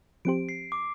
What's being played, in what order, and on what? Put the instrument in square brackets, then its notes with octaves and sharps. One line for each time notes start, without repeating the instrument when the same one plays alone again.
[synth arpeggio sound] F3 C4 G4 C5 [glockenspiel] D7
[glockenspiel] C7
D6